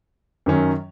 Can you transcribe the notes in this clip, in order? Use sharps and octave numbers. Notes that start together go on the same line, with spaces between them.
F#2 D#3 F#3 C#4